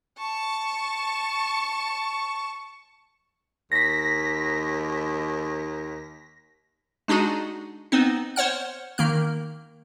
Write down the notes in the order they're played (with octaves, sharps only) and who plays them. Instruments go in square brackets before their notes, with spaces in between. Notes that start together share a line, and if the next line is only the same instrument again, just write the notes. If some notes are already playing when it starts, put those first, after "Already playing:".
[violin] A5 C#6
[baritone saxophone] D#2 [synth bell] A#6 B6
[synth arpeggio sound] G#3 D4 D#4 F#4 G#4
B3 C4 D#4
C5 C#5 F#5 F6
D#3 A#3 F6